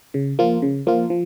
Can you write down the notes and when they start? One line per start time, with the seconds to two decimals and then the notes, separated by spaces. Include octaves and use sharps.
0.14 C#3
0.39 F3 A#3 F4
0.62 C#3
0.87 F3 A#3 F4
1.10 F3